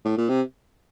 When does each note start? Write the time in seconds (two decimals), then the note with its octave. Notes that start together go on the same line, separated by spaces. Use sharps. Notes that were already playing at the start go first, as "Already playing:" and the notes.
0.04 A2
0.18 A#2
0.29 C3